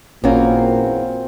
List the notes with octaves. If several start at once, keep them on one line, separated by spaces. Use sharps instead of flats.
A1 E2 A#2 F#3 A#3 C4 C#4 F5